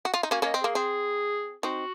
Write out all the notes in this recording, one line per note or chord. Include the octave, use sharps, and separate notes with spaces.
F#4
F4
D#4
A#3 C#4 F#4
A#3 C#4 D#5
C4
A#3 G#4
C4 G#4
C4 D#4 F#4